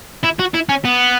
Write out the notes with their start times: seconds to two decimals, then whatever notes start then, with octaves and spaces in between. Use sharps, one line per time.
0.24 E4
0.40 F#4
0.54 E4
0.69 C#4
0.85 B3